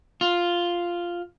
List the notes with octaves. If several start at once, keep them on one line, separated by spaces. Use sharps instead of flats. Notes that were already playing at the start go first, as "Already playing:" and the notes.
F4